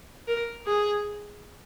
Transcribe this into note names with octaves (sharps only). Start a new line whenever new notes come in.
A#4
G#4